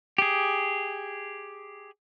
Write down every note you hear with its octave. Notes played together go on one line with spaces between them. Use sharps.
G4 G#4